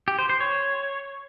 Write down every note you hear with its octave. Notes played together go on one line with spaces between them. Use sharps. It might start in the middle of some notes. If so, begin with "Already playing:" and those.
G4
C5
C5
C#5